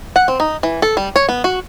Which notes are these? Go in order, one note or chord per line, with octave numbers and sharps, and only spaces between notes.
F#5
C4
D#4
E3
A4
G3
C#5
B3
F#4